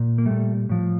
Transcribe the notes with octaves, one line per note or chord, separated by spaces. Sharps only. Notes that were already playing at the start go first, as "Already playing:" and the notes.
Already playing: A#2
A#3
A#2 G3 A3
A2 F3